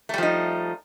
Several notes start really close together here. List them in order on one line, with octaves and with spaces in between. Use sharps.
A3 G3 F3 D#4